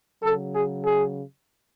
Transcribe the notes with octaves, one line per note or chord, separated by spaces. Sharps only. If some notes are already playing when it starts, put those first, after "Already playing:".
C#3 F#3 A4
G#4
G#4